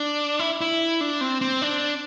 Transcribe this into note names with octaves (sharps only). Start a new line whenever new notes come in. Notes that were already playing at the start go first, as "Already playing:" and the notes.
Already playing: D4
E4
E4
D4
C4
C4
D4